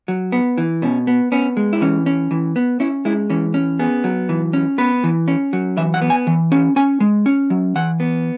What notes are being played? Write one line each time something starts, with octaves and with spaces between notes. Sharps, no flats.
F#3
B3
E3
B2 C#4
B3
B3 C#4
G#3
E4
E3 C#4
C#4
E3
B3
C#4 E4
G#3 E4
E3 C#4
C#4
B3 G#4
F#3
E3
C#4
B3 B4
E3
C#4
F#3
E3 E5
F#5
B3
G#5
E3
C#4
C#4 G#5
G#3
C#4
F#3
E3 F#5
B3